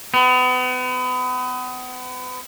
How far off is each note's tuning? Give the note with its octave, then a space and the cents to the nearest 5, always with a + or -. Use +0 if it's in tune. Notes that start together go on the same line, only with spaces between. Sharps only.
B3 +35